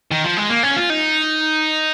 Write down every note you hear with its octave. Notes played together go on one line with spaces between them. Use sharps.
D#3
F3
G#3
A#3
C#4
F4
D#4